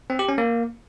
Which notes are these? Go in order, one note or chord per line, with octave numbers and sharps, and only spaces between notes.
C4
G4
C#4
A#3